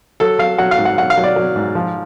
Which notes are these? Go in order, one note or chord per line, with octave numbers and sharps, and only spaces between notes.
F#3 A4
F#3 F5
F#3 F#5
F5
G#2
F#5
F#3 F#5
F5
F#3
D5
F#3
G#2
F3